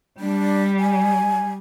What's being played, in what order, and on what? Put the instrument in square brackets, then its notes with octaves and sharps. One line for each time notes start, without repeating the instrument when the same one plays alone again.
[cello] G3 [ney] D4
[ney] G#5